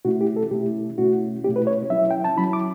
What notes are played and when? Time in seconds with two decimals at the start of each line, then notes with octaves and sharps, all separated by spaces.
0.05 B2 A3 C#4 E4 F#4
0.21 G4
0.36 A4
0.51 B2 A3 C#4 E4 G4
0.98 B2 A3 C#4 E4 F#4
1.44 B2 A3 C#4 E4 G4
1.56 B4
1.67 C#5
1.90 F#3 C#4 E4 E5
2.11 G5
2.24 A5
2.37 F#3 C#4 E4 B5
2.53 D6